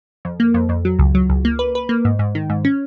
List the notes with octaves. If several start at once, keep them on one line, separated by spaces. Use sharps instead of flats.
F2
A#3
F2
F2
F#3
C#2
F#3
C#2
A#3
B4
B4
A#3
G#2
G#2
D#3
G#2
C#4